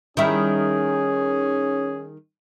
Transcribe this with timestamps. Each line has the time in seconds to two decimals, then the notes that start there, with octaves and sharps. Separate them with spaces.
0.17 D#3 G3 C#4 E4 G#4